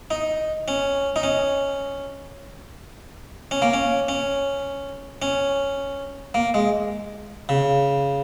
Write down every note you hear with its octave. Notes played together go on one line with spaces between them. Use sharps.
D#4
C#4
D#4
C#4
C#4
A#3
C#4
C#4
C#4
A#3
G#3
C#3